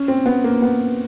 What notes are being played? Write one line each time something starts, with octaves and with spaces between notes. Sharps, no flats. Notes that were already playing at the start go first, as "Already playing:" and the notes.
Already playing: C#4
C4
B3
A#3
B3